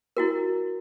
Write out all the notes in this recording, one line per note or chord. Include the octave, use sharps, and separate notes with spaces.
E4 F#4 A#4